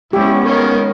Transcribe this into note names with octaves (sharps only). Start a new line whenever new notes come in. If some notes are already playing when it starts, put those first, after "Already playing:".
G#3 B3 C#4 E4 G4
D#3 A#3 C#5